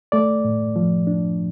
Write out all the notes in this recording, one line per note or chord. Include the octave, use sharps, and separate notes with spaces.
A3 D5
A2
F3
D4